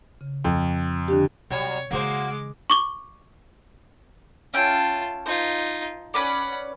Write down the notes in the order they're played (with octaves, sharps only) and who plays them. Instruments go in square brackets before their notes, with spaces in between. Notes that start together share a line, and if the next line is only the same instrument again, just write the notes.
[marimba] C#3
[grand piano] F2
[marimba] D3 D4 G4
[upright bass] C3 C4 [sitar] F#3 G3 [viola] C#5
[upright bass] C#3 E3 [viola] G#3 D6 [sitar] A#3 F#4 C5
[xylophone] C#6 D6 G7
[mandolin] C#4 E5 G5 [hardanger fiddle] F4 A5
[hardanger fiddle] D#4 F4 [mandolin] C5
[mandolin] C#4 B4 D5 [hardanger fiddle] F#5 B5